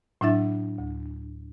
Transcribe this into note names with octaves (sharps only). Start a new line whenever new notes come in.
A2 F#3 D4 E4 E5 A6
D2